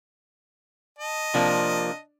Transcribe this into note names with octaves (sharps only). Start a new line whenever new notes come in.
D#5 A5
C3 F3 A#3 D4 D5